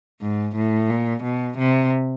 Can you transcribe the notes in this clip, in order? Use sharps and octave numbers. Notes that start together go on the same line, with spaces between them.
G#2
A2
A#2
B2
C3